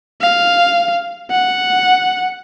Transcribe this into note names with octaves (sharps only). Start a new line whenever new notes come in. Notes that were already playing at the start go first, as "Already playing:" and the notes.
F5
F#5